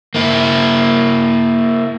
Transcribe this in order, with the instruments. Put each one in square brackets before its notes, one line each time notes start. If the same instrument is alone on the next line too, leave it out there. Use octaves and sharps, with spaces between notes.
[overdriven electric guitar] A#3 E4